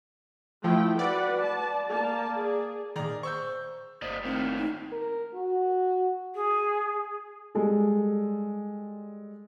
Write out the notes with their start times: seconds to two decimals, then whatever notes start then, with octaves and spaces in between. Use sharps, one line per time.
0.64 F3 A3 E4 G5
0.99 F#4 B4 D5 F#5
1.42 A5
1.90 A#3 A5
2.38 G#4
2.96 A#2 D#3 G#4 D5 A#5
3.23 C5 C#6 E6 G6
4.02 G1 A#3 C5 D5 D#5 B6
4.24 A2 D#3 A#3 C4
4.56 D#4
4.92 A#4
5.34 F#4
6.34 G#4
7.55 G3 G#3 A4